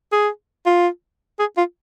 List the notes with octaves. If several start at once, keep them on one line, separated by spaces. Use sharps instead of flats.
G#4
F4
G#4
F4